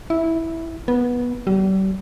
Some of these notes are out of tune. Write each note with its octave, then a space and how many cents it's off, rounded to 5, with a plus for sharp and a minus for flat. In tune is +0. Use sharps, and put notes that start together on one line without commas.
E4 -10
B3 -15
G3 -40